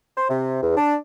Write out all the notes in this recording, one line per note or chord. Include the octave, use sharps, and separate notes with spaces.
C5
C3
E2
D4